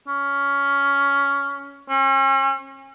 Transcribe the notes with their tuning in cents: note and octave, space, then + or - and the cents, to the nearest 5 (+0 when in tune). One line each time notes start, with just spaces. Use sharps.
C#4 +15
C#4 -40